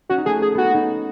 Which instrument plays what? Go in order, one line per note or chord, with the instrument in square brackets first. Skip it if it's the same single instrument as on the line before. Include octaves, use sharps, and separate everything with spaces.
[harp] C#4 [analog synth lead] F#4
[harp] D#4
[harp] A3 C#4 [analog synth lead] G#4
[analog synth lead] G#4
[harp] B3 [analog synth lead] F#4
[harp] C#4
B3 D#4